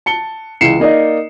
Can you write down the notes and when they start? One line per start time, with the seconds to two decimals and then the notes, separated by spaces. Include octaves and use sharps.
0.06 A5 C#7 G7
0.61 C#2 E3 C7 C#7 E7
0.80 A#3 D#4 D5 D#5